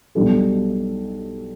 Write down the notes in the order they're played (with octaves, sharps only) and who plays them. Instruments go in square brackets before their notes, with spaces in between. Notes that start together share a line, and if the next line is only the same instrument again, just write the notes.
[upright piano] B1 B2 G3 D4 A4